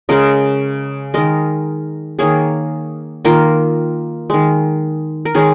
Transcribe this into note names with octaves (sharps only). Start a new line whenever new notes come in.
C#3 G#3 A#4 D#5
D#3 G#3 A#4 D#5
D#3 A#3 G#4 C#5
D#3 A#3 F4 A#4
D#3 G#3
A#4
D#3 G#3 G#4 C#5